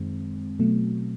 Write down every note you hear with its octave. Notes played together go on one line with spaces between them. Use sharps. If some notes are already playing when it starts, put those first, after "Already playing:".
Already playing: F#2 D#3 G#3 C4
B2 F#3 A3